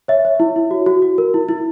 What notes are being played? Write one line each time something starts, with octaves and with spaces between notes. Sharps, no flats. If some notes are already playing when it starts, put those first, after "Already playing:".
C#5 E5
C#5
E4
E4
F#4
F#4
F#4
A#4
E4
E4